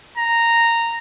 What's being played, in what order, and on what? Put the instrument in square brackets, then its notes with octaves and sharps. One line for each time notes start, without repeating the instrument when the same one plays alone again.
[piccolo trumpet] A#5